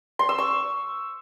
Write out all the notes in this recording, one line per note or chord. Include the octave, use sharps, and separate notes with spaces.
C6
E6
C#6